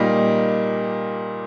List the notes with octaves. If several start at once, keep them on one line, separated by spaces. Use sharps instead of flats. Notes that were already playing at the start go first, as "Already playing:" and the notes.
Already playing: A#2 G3 A#3 D#4